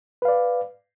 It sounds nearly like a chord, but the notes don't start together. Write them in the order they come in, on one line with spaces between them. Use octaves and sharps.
B4 F5 D5